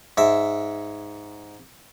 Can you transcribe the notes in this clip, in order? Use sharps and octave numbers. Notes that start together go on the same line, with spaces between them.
G#2 E5